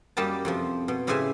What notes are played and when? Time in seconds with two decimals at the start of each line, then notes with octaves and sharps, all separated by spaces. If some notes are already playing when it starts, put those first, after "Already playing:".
0.17 F#2 G3 A#3 G4 D#5 A5
0.45 F2 C3 F3
0.88 B2
1.07 A2 C#3 G4 C5 E5 G#5